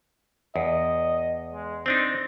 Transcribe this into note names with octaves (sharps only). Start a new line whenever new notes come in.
E2 D#5
G#3
C4 D4 D#4 C5